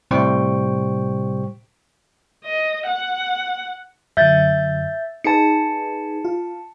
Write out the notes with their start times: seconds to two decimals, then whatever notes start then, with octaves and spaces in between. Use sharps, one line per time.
0.11 A2 C3 G3 C5 G5 C#6
2.45 D#5
2.87 F#5
4.17 F#2 D3 E5 G6 A6
5.24 D#4 G#4 B4 A5 C#7
6.25 F4